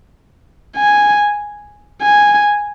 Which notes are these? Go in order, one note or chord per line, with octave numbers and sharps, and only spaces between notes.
G#5
G#5